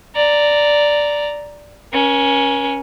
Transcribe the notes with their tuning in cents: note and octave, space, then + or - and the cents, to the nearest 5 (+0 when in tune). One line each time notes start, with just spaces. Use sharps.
D5 +0 A#5 -5
C#4 +0 A#4 +45